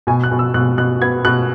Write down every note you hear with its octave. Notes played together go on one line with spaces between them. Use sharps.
B2 G#5
F#6
B2
E6
B2 F#6
B2 F#6
B3 G#6
B2 F#6